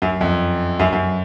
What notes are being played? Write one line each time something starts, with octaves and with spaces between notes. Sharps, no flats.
F#2
F2
F#2
F#2